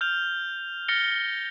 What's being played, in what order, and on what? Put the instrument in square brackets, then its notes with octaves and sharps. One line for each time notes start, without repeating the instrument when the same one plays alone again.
[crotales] F6 G6 F7
F6 A6 A#6 C#7 G7